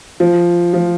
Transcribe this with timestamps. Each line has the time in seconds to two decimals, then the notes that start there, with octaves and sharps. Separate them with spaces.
0.20 F3
0.73 F3